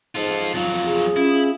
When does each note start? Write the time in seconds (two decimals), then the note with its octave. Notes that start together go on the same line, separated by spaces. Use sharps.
0.15 G#2 F4 A4
0.54 F2 F#3 F4
0.86 G#4
1.16 C#4 E4 F4